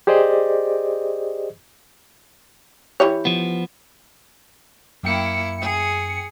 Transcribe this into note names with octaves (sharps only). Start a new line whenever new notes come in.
G4 G#4 C5 D5 D#5
E3 G4 C#5
F3 B3
F#2 A#3 E4 G5 C#7
G#4